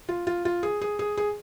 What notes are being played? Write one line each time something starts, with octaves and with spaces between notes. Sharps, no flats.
F4
F4
F4
G#4
G#4
G#4
G#4